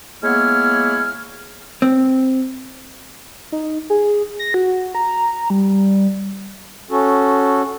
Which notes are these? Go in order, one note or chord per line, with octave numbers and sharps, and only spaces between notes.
G#3 A#3 B3 E4 C#5 F6
C4
D#4
G#4
A#6
F#4
A#5
G3
C#4 F#4 A4